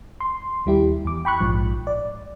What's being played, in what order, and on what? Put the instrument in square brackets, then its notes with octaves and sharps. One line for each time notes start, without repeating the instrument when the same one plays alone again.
[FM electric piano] C6
D#2 G3 E4 G4
E2 D6
G5 B5 C#6 F#6
A#1 G#2 F3
D5